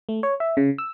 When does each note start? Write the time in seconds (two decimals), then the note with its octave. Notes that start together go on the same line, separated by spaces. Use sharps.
0.09 A3
0.23 C#5
0.40 E5
0.57 C#3
0.78 E6